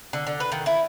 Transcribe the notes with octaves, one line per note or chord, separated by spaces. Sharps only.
D3
D3
B4
D#3
E4